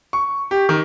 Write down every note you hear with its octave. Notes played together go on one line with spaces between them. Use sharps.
C#6
G4
D#3